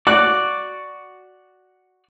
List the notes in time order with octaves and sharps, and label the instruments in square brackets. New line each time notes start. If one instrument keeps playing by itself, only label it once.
[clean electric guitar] F#4 D5 [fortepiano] F#6